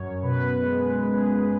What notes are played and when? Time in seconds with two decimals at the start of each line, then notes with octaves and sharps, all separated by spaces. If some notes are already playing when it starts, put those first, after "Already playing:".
Already playing: F#2 C#5
0.22 B2 B4
0.62 G#3
1.01 B2 G#4
1.42 G#3